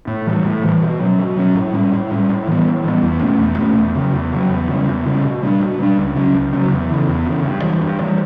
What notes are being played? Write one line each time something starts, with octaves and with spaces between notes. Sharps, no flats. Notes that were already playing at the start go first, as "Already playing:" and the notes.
A2
E3 G3
A2
E3 G3
B2
F#3 C#4
B2
F#3 C#4
A2
G3 C#4
A2
G3 C#4
A2
E3 G3 B3
A2
E3 G3 B3
E2
B2 A3 C#4
E2
B2 A3 C#4
E2
C#3 F#3
E2
C#3 F#3
E2
C#3 G3
E2
C#3 G3
B2
G3 B3 D4
B2
G3 B3 D4
C#2
C#3 F#3 C#4
C#2
C#3 F#3 C#4
E2
C#3 E3
E2
C#3 E3
G2
E3 G3
G2
E3 G3